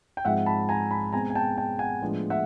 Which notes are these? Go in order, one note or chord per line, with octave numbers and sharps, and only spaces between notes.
G5
G#2 F3 G#3 C4 E5 F#5
A5 B5
G#5 A#5
A5 B5
B2 G#3 C4 G#5 A#5
G#5
G5 A5
G5 A5
F#5 G#5
A2 F3 G#3 B3 D4
E5 F#5